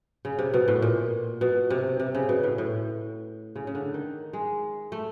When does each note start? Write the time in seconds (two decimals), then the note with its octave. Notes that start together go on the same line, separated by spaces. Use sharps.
0.25 C#3
0.39 C3
0.54 B2
0.68 A2
0.82 A#2
1.41 B2
1.70 C3
2.00 C3
2.15 C#3
2.29 B2
2.43 A2
2.58 A2
3.56 C#3
3.67 C#3
3.75 D3
3.94 D#3
4.33 G#3
4.92 A3